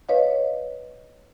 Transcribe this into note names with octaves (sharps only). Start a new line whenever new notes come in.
B4 C#5 D#5 F5